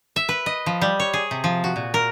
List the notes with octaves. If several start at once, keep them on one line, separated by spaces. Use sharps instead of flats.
E5
B4
D#5
F3
G3
C#5
G#4
C3
F3
F#4
A#2
A#4